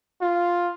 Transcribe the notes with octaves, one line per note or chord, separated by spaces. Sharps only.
F4